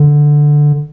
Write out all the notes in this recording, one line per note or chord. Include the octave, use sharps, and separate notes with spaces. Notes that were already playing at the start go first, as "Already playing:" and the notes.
Already playing: D3